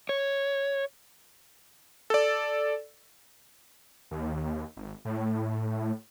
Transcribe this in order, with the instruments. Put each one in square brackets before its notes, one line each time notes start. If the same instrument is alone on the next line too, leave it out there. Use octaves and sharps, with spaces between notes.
[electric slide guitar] C#5
[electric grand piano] A4 D5
[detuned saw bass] D#2
G#1
A2